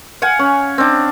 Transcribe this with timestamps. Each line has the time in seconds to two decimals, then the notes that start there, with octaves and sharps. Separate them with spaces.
0.22 F5 F#5 G#5
0.39 C#4
0.78 C4 D4